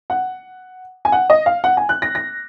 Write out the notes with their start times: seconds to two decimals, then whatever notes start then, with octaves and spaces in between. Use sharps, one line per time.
0.10 F#5
1.05 G#5
1.12 F#5
1.30 D#5
1.46 F5
1.64 F#5
1.77 G#5
1.89 F#6
2.02 A#6
2.15 A#6